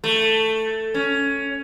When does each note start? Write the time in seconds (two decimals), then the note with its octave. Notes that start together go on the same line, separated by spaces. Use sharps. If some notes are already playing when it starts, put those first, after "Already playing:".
0.04 A3
0.94 C#4